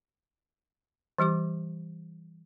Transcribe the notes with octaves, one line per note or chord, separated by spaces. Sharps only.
E3 G3 G4 D6